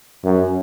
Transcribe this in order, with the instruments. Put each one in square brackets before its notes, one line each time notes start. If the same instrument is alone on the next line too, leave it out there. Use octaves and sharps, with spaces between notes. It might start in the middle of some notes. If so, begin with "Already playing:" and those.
[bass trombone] F#2